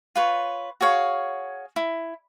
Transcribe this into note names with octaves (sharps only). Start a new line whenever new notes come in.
F4 B4 C#5
F#4 G#4 C#5 F5
E4